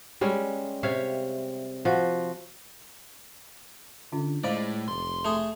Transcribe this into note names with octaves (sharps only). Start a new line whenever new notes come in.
G3 G#3 C#4
C3 C#5 E5 F5
F3 F#4
D3 C#4 D4 F4
A2 G#3 C5 D5 D#5 F5 B5
F1 C6
A3 G#4